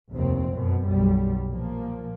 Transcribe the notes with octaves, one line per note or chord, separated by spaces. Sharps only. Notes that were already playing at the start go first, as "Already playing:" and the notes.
F1 A#1 D#2 C3 C4
F#2 B2
B1 G3
A#2 F3 A#3